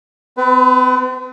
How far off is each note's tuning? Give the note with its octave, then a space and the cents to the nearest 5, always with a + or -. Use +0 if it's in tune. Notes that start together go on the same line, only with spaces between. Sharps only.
C4 -40 B4 +25